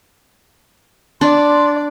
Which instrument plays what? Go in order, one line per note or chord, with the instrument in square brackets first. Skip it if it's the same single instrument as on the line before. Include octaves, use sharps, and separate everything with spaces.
[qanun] D4 [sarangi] D5 [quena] C6